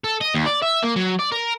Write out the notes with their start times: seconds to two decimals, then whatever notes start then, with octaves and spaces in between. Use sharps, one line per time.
0.04 A4
0.21 D#5
0.34 D#2
0.46 D5
0.62 E5
0.83 A#3
0.96 F#3
1.19 D5
1.32 A#4